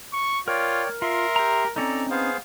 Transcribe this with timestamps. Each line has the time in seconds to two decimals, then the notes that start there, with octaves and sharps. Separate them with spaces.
0.13 C#6
0.48 F4 A#4 C#5 D5 G5
1.02 F4 A#4 E5 C6
1.36 G4 A#5
1.76 C4 C#4 D#4 A4 D5 A#5
2.10 B3 G#4 C5 F5